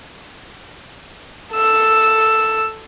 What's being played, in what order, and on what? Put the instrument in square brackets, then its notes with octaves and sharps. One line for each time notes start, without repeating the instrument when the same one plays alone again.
[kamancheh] A4 E6